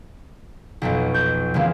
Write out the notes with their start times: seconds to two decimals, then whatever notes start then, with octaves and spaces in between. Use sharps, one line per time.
0.82 B1 F2 B2
1.14 G6
1.54 C#3 E3 G#3 A#3 C4